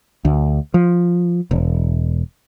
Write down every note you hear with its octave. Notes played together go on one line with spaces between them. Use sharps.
D2
F3
E1